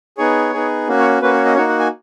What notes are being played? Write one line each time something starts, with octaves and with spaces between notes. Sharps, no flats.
B3 D#4 G#4 C#5
B3 D#4 G#4
A#3 C#4 F#4
C#5
A#3 C#4 F#4 B4
C#5
D#5
A#3 D#4 F#4 C#5
F#5
G#5